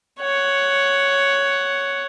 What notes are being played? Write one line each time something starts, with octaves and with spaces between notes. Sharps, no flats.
C#5 F#5